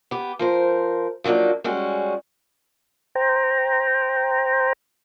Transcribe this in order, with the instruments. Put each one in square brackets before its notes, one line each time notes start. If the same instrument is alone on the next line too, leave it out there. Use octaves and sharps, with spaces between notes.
[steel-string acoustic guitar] B3 G4
F3 A#4 C5
F3 F#3 A#3 D4 D#4
G3 G#3 C#4 F#4
[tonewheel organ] C5 G5 A#5